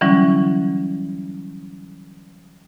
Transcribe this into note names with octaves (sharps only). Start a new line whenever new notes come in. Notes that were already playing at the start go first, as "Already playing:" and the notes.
D3 E3 F#3 G3 C#4 E4